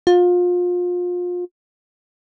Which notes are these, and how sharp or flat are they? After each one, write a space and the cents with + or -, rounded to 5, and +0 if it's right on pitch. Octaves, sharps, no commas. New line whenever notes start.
F4 +30